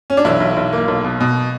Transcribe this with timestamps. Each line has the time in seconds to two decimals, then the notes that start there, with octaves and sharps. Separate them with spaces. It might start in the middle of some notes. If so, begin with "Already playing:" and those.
0.10 C#4
0.17 D4
0.25 B1 E3 E4
0.40 B1
0.57 B1
0.73 A#3
0.88 B1
1.04 B2
1.20 B2